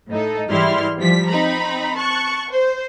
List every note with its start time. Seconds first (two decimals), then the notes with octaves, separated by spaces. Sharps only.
0.10 A2 D#4 A4
0.49 G#2 E3 G3 E4 C6 F6
0.99 F3 G3 B6
1.29 C4 D#4 A#5 B5
1.97 A5 C#6 F#6
2.50 C5